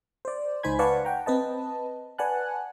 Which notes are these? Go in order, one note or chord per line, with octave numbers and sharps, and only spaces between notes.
C5 D5
C#2 D#4 C5 G#5 B5 G#6
B4 D5 F5 F#5 A5 C#6
F#5 G5 A#5
C4 B4 D#5 A5
B4 D5 F#5 G#5 A5 F#6